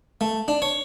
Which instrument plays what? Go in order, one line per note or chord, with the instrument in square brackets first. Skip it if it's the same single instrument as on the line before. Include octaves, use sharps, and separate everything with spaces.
[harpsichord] A3
D4
C#5